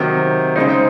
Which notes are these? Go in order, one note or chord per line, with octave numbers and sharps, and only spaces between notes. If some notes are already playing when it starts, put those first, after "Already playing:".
Already playing: C3 D#3 F#3
C#3 G#3 C4 D#4